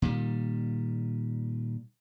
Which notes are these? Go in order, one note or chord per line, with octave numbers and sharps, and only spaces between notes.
A#2 D#3 G3